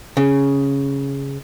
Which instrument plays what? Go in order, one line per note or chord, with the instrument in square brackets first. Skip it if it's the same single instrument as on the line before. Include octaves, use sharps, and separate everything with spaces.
[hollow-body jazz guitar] C#3